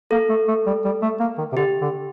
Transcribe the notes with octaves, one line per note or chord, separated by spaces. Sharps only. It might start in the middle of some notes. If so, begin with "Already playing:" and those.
A#3 A4
A3
A3
G3
G3
A3
A#3
D#3
C3
D3 G4
D3